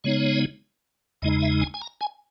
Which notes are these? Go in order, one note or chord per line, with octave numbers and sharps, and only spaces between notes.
C#3 G#3 B3 D#4 C#5
E2 C#3 G#3 D#4 D#5
E5
G#5
G#5
A#5
G#5